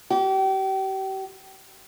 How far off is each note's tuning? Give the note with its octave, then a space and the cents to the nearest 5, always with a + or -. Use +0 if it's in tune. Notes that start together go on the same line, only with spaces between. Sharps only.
G4 -35